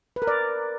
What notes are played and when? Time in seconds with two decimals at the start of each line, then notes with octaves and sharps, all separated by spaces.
0.16 B4
0.22 A#4
0.27 D5